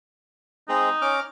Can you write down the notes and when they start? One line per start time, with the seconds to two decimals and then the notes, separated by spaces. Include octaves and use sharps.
0.69 G#3 C4 D#4 G#4
1.02 C#4 D6 F6